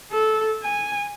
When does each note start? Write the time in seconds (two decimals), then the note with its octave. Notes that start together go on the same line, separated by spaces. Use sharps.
0.12 A4
0.63 G#5